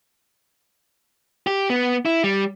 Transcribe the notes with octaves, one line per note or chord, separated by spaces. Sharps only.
G4
B3
E4
G3